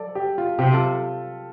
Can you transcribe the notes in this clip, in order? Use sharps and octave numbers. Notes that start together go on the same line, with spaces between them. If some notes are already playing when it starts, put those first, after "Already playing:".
Already playing: A4 D5
G4
F4
C3 G4
F4 A4